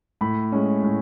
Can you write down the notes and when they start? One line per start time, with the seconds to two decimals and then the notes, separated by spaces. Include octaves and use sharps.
0.21 A2 B5
0.52 G#3 C#4
0.83 A2